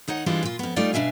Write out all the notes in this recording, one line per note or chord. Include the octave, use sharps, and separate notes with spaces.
D#2 D#4 C#5 F#5
E3 G3 G#3 D4 F4
A#2 F4
F2 B3
G3 A3 D#4 F4 D5
B2 D4 E5 F5 G#5